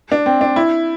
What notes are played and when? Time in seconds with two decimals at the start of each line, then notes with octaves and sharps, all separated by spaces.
0.12 D4
0.26 C4
0.41 D4
0.56 E4